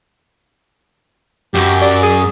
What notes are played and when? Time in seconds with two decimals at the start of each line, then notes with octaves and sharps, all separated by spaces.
1.54 F#2 G4
1.82 D5
2.03 G#4